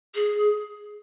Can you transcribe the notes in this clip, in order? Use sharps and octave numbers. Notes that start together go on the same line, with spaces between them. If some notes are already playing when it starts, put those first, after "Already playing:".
G#4